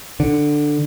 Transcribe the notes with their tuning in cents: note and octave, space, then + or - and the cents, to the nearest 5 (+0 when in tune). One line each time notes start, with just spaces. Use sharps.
D3 +10